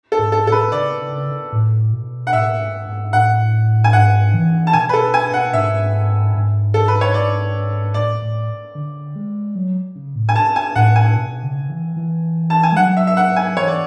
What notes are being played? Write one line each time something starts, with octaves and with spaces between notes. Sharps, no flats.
A4
G#2
A4
A2 A4
B4
C#3 D5
C#3
A2
B2
F#5
A2 E5
G#2
G#2
A2 F#5
G#5
G#2 F#5
E3
A5
B2 G#5
B4
A4
G#5
F#5
G#2 E5
G#2
A4
B4
C#5
D5
A2 D5
A2
D3
G#3
F#3
C#3
A2
G#5
A5
G#5
A2 F#5
G#5
B2
C#3
E3
E3
A5
G#5
G#3
F#3 F#5
E5
E5
F#5
G#5
E3 C#5
D5